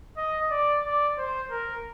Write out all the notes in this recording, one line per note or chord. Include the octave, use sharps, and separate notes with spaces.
D#5
D5
D5
C5
A#4